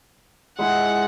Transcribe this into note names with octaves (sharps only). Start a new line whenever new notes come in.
G#3 E4 G#4 F#5